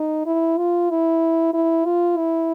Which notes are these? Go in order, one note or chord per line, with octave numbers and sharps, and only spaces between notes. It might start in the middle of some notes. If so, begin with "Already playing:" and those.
Already playing: D#4
E4
F4
E4
E4
F4
E4